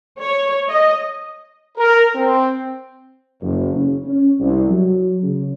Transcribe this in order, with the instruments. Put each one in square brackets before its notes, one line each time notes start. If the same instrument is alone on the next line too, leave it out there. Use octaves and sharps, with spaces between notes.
[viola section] C#5
D#5
[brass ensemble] A#4
C4
F#1
C#3
C#4
C2
F#3
C#3